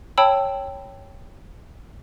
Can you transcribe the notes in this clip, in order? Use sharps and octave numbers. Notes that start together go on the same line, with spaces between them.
C#5 G5 A5 B5 E6